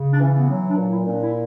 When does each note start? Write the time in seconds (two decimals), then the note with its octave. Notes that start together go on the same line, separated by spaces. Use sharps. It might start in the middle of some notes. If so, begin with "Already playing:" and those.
Already playing: C#3
0.13 D4
0.20 E3 C#4
0.37 B3
0.48 F#3 C#4
0.69 D4
0.77 A#2
0.90 E4
1.04 A#2 C#4
1.12 D4
1.22 E4